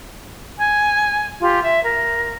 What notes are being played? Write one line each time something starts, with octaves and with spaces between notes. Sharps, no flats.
G#5
F4 G4
E5
A#4